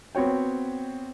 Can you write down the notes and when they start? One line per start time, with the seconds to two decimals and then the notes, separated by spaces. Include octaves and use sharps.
0.15 B3 C4 F#4 C#5 G5